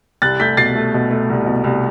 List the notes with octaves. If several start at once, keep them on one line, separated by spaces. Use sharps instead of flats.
C2 F#6 A6
A3 G6 B6
B2 A6 C7
A3
B2
A3
C2
B2
C2